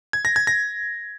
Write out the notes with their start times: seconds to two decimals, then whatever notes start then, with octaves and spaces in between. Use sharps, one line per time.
0.13 G#6
0.25 A#6
0.36 G#6
0.47 A#6